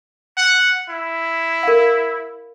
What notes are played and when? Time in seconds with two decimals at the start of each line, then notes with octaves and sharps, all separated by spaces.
0.37 F#5
0.89 E4
1.63 A#4 F5